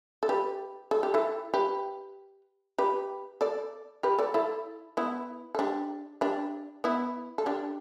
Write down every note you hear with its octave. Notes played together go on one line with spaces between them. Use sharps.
A4
G4 B4
A4
G4
E4 A4
G4 B4
G4 B4
A4 D5
G4 B4
A4 D5
E4 A4
B3 E4
A4
D4 G4
D4 G4
B3 E4
A4
D4 G4